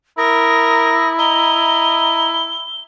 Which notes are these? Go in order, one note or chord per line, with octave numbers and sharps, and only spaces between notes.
E4 A#4 D#6 A#6
D#5 A#5 G7